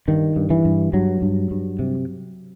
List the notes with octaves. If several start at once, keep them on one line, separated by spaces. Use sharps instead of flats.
G2 D#3
G2
E3
G2
G2 F#3
G2
G2
C3